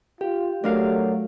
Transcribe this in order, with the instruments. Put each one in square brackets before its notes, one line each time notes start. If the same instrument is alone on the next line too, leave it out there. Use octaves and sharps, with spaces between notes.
[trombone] F4 [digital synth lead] G4
[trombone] F#3 [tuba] A3 [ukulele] D4 A#4 F5